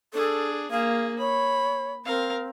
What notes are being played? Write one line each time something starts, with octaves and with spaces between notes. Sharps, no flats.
D4 G#4 A4
A#3 G#4 F5
C#5 B5
C4 A#4 F5